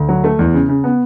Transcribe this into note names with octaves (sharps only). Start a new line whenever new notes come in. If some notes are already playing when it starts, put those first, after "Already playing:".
Already playing: D2
F#3
A3
E2
C#3
C#3
B3